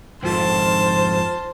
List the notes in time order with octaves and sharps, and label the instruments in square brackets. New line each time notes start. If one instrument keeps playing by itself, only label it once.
[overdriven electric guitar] F2 G#2 [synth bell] D#3 F4 [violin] C5 [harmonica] A5